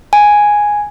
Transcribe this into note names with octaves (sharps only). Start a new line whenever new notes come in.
G#5